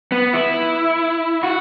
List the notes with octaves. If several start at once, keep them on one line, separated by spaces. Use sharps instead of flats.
B3
E4
F#4